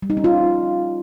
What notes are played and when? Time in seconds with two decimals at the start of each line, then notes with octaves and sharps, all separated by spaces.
0.02 G3
0.10 D#4
0.17 C#4
0.24 F4